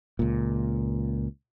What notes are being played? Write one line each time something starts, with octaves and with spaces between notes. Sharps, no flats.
C#2 A#2